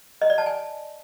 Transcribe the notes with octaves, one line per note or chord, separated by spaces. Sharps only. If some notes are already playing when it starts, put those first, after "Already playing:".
D#5
D5
A5
G#5